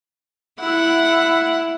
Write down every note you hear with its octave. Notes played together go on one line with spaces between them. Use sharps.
E4 F#5